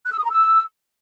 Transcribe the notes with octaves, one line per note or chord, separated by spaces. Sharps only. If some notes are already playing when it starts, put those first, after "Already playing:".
F#6
E6
D#6
A#5
E6